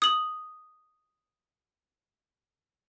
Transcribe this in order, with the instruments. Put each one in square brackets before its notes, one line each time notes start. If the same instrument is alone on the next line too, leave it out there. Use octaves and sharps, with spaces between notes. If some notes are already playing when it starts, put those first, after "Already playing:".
[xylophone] D#6 F#7